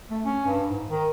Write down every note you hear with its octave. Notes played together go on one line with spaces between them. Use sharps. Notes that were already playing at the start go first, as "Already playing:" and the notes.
A3
C#4
G2
G#2
D#3